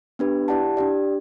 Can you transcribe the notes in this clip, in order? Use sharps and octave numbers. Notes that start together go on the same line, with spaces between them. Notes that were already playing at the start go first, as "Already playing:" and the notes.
B3 D4 G4 B4
E4 G4 D5 F#5 A5
D4 G4 D5